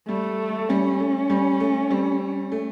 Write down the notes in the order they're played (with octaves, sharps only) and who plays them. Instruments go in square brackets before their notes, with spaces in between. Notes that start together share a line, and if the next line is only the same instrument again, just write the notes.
[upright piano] G3 [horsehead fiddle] A3
[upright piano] G3 [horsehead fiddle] C#4
[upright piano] A3
G3
A3
G3
A3